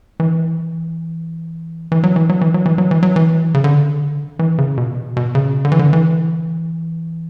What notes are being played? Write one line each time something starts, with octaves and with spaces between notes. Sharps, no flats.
E3
E3
F#3
E3
F#3
E3
F#3
E3
F#3
E3
F#3
E3
C#3
D3
E3
C#3
B2
B2
C#3
D3
E3
D3
E3